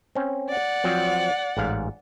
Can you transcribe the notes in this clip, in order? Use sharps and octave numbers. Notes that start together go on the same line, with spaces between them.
C4 C#4
D5 F#5
F3 F#3 C4
A1 G#2 F5